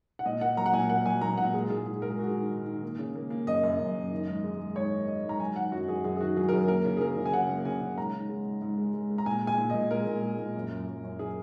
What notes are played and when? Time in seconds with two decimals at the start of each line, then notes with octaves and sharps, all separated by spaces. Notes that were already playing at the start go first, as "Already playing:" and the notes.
0.19 F#5
0.25 A#2 D#5
0.41 A#3 F#5
0.57 F#3 A#5
0.66 F#5
0.73 A#2 G#5
0.89 A#3 F#5
1.06 F#3 G#5
1.21 A#2 A#5
1.37 A#2 F#5
1.54 G#3 G#4
1.69 G#2 G#4
1.86 G#2 G#4
2.02 G#2 A#4
2.10 G#4
2.19 G#2 F#4
2.27 G#4
2.34 D#3
2.50 G#2
2.66 D#3
2.83 A#3
2.99 C#3
3.15 A#3
3.30 A#3
3.47 F#2 D#5
3.63 F#2
3.79 F#2
3.95 F#2
4.12 D#3
4.28 G#2
4.44 G#3
4.60 G#3
4.76 G#2 C#5
4.92 D#3
5.08 D#3 D#5
5.24 G#2
5.29 A#5
5.40 F#3 G#5
5.56 D#3 F#5
5.72 F#2 F#4
5.88 F#2 G#4
6.04 F#2 G#4
6.16 G#4
6.21 D#3 F#4
6.37 F#3 G#4
6.49 A#4
6.53 F#2 G#4
6.68 A#3 A#4
6.85 C#3
6.97 G#4
7.01 F#3 A#4
7.17 C#3
7.26 G#5
7.33 C#3 F#5
7.49 A#3
7.65 C#3 G#5
7.81 C#3
7.97 G#2 A#5
8.14 G#2
8.29 G#3
8.45 G#2
8.62 G#2
8.78 G#3
8.94 G#3
9.10 G#3
9.18 A#5
9.26 A#2 G#5
9.42 G#3
9.47 G#5
9.58 A#2
9.70 A#2 D#5
9.91 G#3 A#4
10.07 A#2
10.23 G#3
10.39 A#2
10.55 F#2
10.71 F#2
10.87 F#2
11.04 F#2
11.19 G#4